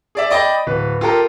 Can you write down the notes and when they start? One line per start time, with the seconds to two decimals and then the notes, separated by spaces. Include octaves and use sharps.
0.15 G#4 D5 E5
0.30 D5 D#5 G5 B5
0.67 D1 B4
1.01 F4 G4 A4 A#4